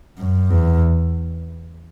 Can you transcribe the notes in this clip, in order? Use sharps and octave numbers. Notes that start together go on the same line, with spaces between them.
F#2
E2